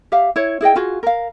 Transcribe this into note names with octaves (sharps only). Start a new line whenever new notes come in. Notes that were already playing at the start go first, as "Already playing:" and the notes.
G4 E5 F5
E4 C#5
E4 G#4 D#5 G5
F4 F#4 G#4
A#4 F5